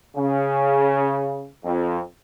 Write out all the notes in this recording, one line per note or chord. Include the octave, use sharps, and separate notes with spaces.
C#3
F2